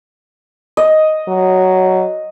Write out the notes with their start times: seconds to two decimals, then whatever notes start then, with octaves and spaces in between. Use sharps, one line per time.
0.77 D#5
1.28 F#3